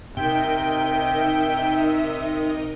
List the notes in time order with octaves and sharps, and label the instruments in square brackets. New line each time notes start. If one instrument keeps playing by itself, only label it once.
[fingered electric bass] C3 [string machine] D#4 A#4 D#5 [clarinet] E5 [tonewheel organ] G5